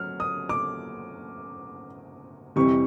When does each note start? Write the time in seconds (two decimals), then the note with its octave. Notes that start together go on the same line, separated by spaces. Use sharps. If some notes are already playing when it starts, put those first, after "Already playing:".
Already playing: F#3 F6
0.20 D#6
0.49 D6
2.56 F2 C3 E3 G3 C#6